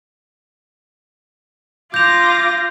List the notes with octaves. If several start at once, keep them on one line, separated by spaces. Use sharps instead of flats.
F4 D6 G6 A#6 F7